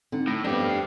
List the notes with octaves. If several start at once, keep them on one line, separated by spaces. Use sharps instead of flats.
D3 C4 D#4
A2 A#6
F2 B3 D4 G4
F6 C7